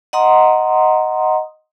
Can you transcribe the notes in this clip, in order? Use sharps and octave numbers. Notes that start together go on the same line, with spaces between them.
D#5 F#5 A#5 C6 D#6